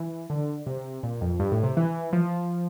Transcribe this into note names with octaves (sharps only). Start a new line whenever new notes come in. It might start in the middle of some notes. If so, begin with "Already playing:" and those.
Already playing: E3
D3
C3
A#2
F2
G2
A2
C3
E3
F3